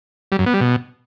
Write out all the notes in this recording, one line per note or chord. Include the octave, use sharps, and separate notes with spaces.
G3
F#2
B3
G3
B2